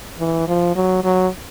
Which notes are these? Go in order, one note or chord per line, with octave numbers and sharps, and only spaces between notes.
E3
F3
F#3
F#3